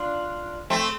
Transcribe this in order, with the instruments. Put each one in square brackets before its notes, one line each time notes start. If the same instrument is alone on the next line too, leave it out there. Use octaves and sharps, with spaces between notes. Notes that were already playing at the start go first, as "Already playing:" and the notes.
Already playing: [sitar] D4 F4
A3 C4